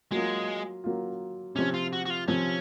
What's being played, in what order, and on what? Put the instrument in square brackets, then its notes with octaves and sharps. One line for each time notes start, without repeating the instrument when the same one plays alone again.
[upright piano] F#3 A#3 F4 [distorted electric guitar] G#3
[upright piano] F#3 A#3 F4
[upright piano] C3 F3 C4 [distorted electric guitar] C#4
[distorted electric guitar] F4
F#4
F#4
F4
[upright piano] C3 F3 C4 [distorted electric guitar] C#4